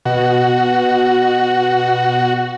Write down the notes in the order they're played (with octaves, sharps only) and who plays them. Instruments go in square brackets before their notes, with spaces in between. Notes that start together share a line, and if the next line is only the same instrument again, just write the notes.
[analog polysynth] B2 [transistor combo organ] F#4